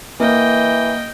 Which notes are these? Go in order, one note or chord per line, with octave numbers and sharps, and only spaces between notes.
E3 A#3 D#5 G5